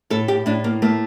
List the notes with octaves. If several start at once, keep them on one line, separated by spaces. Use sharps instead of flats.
A2 A4
G4
A2 D4
A#3
A3 A#3